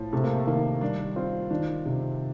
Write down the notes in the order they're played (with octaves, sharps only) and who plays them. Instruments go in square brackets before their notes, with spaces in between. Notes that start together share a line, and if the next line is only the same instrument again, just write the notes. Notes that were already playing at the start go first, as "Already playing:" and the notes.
Already playing: [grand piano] A2 [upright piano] F3
[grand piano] C3 [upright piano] A3
[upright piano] A#3
A3
[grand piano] D#3 [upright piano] A#3
[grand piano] G3 [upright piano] D4
[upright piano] C4 [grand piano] F4
[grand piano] D#3 [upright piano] D4
[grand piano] C3